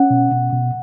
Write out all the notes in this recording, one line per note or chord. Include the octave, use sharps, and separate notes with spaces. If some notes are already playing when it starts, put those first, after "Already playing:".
Already playing: C#4 F#5
B2
B2
B2